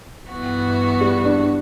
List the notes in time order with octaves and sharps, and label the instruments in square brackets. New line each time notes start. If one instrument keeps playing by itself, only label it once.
[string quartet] G2 E3 B3 F#4
[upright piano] G3
D4